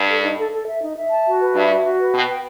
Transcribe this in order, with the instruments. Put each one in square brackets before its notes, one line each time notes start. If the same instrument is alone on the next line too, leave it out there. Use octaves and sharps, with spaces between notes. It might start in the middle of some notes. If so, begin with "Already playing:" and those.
Already playing: [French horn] G2
[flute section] A4
D#4
A4
A4
E5
D#4
E5
A5
F#4
B4
[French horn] G2 [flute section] E5
[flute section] F#4
F#4
B4
[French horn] B2 [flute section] G5
[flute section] G5